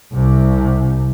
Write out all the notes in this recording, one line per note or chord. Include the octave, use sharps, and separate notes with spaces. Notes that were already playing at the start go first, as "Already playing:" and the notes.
C2 C3